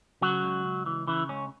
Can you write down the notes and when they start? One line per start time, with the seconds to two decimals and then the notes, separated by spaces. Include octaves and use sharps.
0.21 C#3 F#3 F#4
0.43 C#2
0.65 C#2
0.86 E3
1.07 C#3 E3 E4
1.29 C#2 C#4